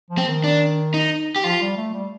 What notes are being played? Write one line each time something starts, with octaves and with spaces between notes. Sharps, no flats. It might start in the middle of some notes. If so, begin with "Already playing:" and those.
F3
C4
D#3
D4
D#4
G4
F3 F4
G3
A3
G3